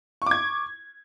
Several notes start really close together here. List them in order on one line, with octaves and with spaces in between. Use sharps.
C#6 D6 G#6